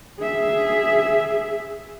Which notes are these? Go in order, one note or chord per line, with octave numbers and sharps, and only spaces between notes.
G#4 E5